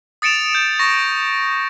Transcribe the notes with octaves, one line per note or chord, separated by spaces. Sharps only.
D#6 A6 C#7 D7 E7 F7
G6
C#6 A#6